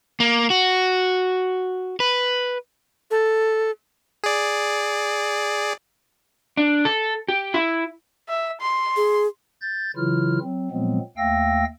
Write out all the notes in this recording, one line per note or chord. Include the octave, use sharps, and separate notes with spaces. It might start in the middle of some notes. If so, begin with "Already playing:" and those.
A#3
F#4
B4
A4
G#4 D5
D4
A4
G4
E4
E5
C6
G#4
G6 A6
C#3 E3 F#3 E4 F4 F6
F#3 C4
A#2 F3 F#3 G#3 B3 C4
D#2 A3 F5 G5 E6 A#6